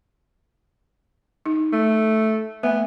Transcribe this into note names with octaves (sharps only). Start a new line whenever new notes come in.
D#4
A3
A3 B3 E5